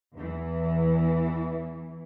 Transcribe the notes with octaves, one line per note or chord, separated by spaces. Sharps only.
E2 E3